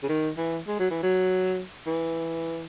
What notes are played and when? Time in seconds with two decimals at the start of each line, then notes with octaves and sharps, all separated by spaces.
0.03 C#3
0.09 D#3
0.38 E3
0.68 G#3
0.80 F#3
0.91 E3
1.03 F#3
1.87 E3